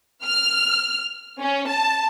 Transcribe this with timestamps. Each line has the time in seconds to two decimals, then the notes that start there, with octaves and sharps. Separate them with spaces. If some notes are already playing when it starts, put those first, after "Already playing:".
0.24 F6
1.40 C#4
1.68 A5